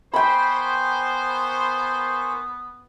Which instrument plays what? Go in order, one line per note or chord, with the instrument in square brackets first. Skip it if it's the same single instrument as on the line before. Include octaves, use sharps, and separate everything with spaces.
[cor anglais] B3 [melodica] A#4 G#5 C#6 [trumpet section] C5 [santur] G5 B5